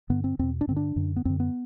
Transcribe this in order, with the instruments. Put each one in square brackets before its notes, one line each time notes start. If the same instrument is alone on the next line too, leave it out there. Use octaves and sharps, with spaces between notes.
[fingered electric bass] G2 D3 B3
C4
E2 B2 C4
D4
G2 D3 C4
D4
F#2 D3
B3
F#2 D3 C4
B3